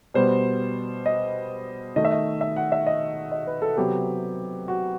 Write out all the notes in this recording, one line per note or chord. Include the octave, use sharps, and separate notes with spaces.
B2 G3 B3 C5
D#5
D#3 A3 D#5
E5
D#5
E5
F#5
E5
D#5
D#5
B4
A4
C3 F#3 B3 G4
F#4